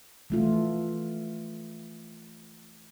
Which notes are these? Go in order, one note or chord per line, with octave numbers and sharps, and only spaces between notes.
E3 A3 F4